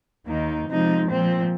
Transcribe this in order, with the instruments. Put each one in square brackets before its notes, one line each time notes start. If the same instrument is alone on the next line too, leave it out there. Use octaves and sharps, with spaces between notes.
[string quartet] D#2 D#3 A#3 D#4
C3 F3 G#3 D#4
A#2 F3 C4